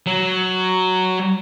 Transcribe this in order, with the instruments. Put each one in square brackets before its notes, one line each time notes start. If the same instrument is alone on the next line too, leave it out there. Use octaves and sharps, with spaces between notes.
[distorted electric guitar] F#3